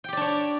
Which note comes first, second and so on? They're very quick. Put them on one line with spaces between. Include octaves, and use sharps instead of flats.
G5 G4 D5 D4 C#5